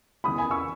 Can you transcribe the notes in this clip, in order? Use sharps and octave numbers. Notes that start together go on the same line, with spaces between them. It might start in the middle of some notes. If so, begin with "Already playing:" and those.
E2 C#3 E3 B5 D#6
G#5 B5
C#6 E6